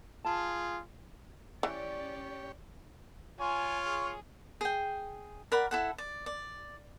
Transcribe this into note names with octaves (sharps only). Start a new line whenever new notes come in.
F4 G#4 A5
E3 C#4 G4 C#5 D5
F4 C#5 G#5
G#4
G#4 G5
A#4 D5 F#5 B5
E4 A4 F#5
D5
D5